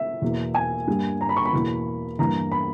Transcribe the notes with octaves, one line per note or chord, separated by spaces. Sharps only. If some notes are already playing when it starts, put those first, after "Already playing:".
Already playing: E5
E2 B2 A#3
G#5
G2 G3 A#3
A#5
B5
C#6
B5
E2 B2 A#3
G2 E3 A#3 A#5
B5